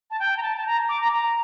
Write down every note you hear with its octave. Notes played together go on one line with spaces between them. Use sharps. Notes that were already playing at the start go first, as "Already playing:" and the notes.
A5
G5
A#5
A5
A5
A#5
D6
A#5
A#5